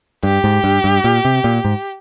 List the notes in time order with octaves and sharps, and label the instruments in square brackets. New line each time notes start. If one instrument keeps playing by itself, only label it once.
[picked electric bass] G2 [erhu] G4
[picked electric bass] G#2
G2
G2
A#2
C3
A#2
G#2